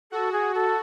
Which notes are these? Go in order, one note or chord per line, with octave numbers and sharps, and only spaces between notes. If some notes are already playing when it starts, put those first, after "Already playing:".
F#4 A4
G#4
A4